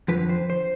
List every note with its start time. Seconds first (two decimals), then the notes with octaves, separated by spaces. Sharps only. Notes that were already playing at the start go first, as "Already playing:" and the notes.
0.08 F2 D3 F3 B4
0.29 C5
0.50 C5